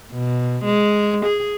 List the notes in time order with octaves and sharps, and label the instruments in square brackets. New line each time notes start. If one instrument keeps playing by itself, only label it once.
[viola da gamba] B2
G#3
G#4